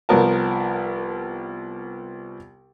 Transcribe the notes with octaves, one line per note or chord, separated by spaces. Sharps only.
C2 F3 B3 A#4 A5